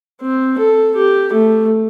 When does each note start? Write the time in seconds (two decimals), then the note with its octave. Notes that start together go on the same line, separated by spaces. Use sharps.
0.21 C4
0.59 A4
0.96 G4
1.33 A3